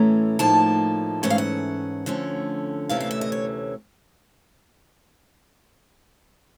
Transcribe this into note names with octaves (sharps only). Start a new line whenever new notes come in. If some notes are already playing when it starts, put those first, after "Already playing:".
Already playing: A2 E3 A3 C#4 A#5
A2 F3 A#3 D#4 A5
G#2 E3 A3 C#4 F#5
F5
F#5
D3 F3 A3 C#4
D2 C3 E3 A3 C#4 F5
F5
E5
D#5
C#5